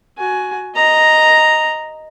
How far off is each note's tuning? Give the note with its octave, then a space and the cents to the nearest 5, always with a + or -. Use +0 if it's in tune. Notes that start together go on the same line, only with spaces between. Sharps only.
F#4 +0 G#5 +20
D#5 +0 A#5 +0